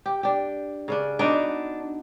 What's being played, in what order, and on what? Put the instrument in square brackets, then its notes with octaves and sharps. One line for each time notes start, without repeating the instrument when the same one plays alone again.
[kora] G4
D4 G4
C#3 C#4 D4
[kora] B3 D#4 F#4 [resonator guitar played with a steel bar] D4